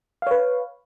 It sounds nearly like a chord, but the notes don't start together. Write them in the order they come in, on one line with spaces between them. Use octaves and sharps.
F5 C#5 B4